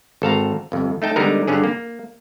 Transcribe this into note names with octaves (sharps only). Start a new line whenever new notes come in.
G#1 A4 F5 A#5
G1 F2
A3 D#4 G5 A5
D3 G3 G#3 B3 D#4 A#4
G2 D3 C#4 G#4
A#3